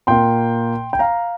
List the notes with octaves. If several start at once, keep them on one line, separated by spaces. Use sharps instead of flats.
A#2 A#3 G5 C6
G5
F5 A#5